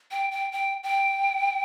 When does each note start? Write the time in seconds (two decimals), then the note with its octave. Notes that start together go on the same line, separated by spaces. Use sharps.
0.11 G5
0.31 G5
0.52 G5
0.83 G5